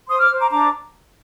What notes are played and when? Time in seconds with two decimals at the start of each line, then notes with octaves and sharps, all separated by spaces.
0.08 C5 C6 D#6
0.19 D6 F6
0.30 C5
0.40 A#5 D6
0.51 D4 A#5 D6